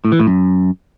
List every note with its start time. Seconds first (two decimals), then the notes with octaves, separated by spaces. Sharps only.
0.05 A2
0.12 E3
0.20 A2
0.27 F#2